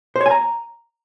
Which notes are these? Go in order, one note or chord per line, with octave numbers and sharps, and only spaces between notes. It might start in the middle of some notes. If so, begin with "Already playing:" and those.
C5
C#5
G#5
A#5